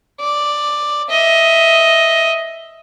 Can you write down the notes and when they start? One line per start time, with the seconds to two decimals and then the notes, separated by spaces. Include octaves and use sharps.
0.20 D5
1.10 D#5 E5